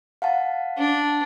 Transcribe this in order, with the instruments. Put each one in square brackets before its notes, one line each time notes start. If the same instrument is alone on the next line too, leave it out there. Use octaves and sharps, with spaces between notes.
[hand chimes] F5 F#5 A5
[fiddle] D4